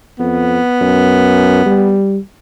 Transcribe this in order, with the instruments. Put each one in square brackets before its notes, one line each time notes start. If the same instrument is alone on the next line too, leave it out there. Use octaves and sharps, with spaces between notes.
[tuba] F2 [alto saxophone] B3
[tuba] F#2
G3